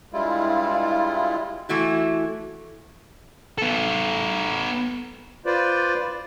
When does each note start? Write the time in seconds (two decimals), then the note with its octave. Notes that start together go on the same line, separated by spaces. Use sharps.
0.13 G2 G3 G#3 E4 F4
1.69 E3 A3 E4 F#4
3.58 B3 A4
5.46 F4 B4 C5 D5